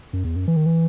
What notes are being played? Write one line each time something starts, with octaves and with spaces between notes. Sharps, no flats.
F#2
E2
F#2
E3
D#3
E3